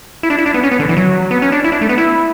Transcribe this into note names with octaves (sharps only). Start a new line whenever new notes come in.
E4
D4
E4
D4
B3
C#4
B3
D3
E3
F#3
B3
C#4
D4
E4
D4
A3
B3
E4